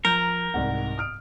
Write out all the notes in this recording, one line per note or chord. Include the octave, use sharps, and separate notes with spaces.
F3 A#4 A#5 G6
C2 G#2 F#5
D#6 F6 D7